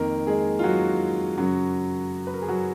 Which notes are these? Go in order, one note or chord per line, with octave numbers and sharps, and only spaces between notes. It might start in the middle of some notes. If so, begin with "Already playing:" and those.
Already playing: F2 D#3 A#3 A#4
G#3 G#4
F4
F#3 F#4
F#2 C#3 F#3 F#4
B4
A#4
G#4
F#3 F#4